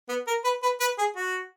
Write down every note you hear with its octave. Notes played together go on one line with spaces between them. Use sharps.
B3
A#4
B4
B4
B4
G#4
F#4